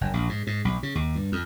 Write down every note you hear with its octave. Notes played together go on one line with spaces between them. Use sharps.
F#1
A#1
G#2
G#2
B1
C#3
D#2
G2
F2